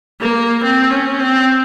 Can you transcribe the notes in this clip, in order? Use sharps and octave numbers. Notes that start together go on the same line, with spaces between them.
A#3
C4
C#4
C4